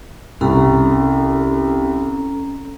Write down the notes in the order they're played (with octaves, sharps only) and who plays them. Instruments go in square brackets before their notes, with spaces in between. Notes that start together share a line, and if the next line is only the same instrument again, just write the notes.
[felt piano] C2 [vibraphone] C#4 A4 A#5